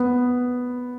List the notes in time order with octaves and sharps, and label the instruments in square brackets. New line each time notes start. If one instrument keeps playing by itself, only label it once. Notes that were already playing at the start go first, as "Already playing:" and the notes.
Already playing: [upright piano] B3